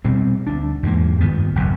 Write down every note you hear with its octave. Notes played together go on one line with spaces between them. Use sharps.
B2 G3 C4
D2 D4
E2 G#2 A3 A#3
G2 D#3 B3
F#1 B1 F2